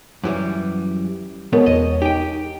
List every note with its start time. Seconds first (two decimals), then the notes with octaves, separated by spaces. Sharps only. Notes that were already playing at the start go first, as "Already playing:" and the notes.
0.24 F#2 E3 G3
1.53 B2 F3 G#3 B3 A#4 C#5
1.66 E2 C#5 D#5
2.02 D#4 G4 G5